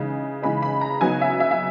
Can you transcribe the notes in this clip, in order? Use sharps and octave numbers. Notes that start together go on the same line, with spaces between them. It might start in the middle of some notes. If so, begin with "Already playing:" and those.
Already playing: C#3 E3 G#3 D#4
C#3 E3 G#3 D#4 B5
B5
A#5
C#3 F#3 B3 D#4 G#5
E5
E5
E5